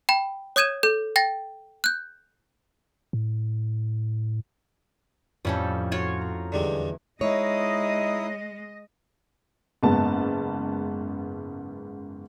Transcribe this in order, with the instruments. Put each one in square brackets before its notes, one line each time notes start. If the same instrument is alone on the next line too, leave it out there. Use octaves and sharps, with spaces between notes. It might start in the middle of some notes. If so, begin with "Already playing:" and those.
[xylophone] G5 B5
C#5 D#6 G6 G#6 D#7 E7
A4 G6
G5 A6 A#6
F#6 G6
[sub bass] A2
[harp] F2 A2 B5 [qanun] G3 C#4 A4
[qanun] F4 F#4 C#5
[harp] A#5
[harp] E2 [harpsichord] D3 G3 G#3
[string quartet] G#3 [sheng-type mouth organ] D#4 E4 D#6 [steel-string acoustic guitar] C#5 [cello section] D#5
[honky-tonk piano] F#1 G#2 B3 A5